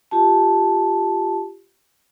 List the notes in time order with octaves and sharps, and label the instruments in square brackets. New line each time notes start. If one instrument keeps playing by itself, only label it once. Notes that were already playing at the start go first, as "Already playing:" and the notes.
[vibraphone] F4 G4 A5